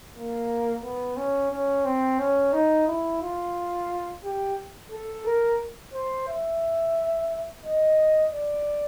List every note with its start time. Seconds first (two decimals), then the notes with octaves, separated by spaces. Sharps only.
0.15 A#3
0.84 B3
1.17 C#4
1.51 C#4
1.85 C4
2.19 C#4
2.53 D#4
2.88 E4
3.22 F4
4.24 G4
4.92 A4
5.26 A#4
5.94 C5
6.28 E5
7.64 D#5
8.33 D5